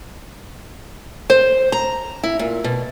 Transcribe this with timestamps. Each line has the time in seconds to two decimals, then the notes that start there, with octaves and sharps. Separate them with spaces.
1.30 C5
1.72 A#5
2.23 E4
2.39 A#2
2.64 B2